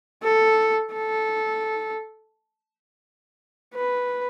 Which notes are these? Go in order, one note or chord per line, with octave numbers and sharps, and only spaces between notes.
A4
A4
B4